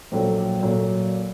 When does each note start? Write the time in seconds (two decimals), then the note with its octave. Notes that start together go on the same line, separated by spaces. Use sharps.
0.12 A#1 A#2 F#3 A3
0.63 A#2 F#3 A3